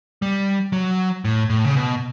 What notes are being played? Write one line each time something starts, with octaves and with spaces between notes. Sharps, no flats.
G3
F#3
A2
A2
C#3
B2